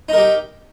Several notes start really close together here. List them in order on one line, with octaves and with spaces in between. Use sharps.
D#4 A#4 G4